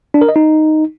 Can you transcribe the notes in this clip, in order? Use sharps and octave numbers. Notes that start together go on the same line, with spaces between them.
D4
A#4
D#5
D#4